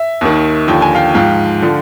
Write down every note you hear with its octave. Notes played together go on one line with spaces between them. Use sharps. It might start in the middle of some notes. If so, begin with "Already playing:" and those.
Already playing: E5
D#2 D#3
D#2 D3 F3 G5
G#5
F5 G5
G#2 F3 F5 G5
D3 F3